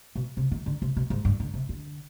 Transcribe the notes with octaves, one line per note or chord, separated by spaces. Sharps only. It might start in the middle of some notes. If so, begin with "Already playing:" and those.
B2
C3
D#3
D3
C3
B2
G#2
G2
D3
C3
D3